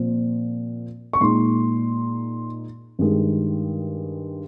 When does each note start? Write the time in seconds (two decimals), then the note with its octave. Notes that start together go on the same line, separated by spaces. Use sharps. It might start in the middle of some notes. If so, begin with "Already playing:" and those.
Already playing: A#2 F3 C4
1.13 C#6
1.20 A#2 G#3 D#4 C6
2.99 G2 D#3 G#3